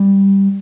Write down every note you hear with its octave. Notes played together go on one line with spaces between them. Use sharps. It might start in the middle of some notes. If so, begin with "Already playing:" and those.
Already playing: G3